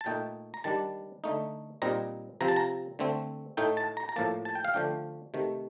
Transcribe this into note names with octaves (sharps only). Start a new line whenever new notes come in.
A5
A#2 A3 D#4 G5
A#5
D#3 G3 D4 A5
D3 A3 D#4
A#2 G3 C4 D#4 A#5
C3 F3 C4 A#5
A5
A#5
D3 A3 C4
A2 A3 D#4 G5
A5
A#5
A#5
A2 F3 A#3 A5
A5
G5
F5
D3 F3 A3 D4 G5
C3 D#3 A3